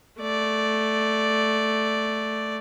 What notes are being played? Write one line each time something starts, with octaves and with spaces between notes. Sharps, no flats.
A3 D5